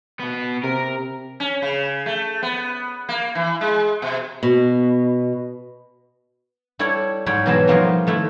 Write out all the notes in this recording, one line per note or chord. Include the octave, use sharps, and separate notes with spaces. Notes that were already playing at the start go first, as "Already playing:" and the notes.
B2 B3
C3 A#4
C#4
C#3
A3
B3
A#3
E3
G#3
B2
B2
G3 E4 A4 C#5 D5
G#2 G3 G#4 C#5 G5 B5
B2 E3 F#3 G#3 B4 A5
F3 G3 A3 A#3 C4 D#4
D#3 A3 E4